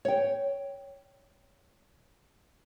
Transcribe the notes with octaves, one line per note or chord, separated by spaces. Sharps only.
C#5 G5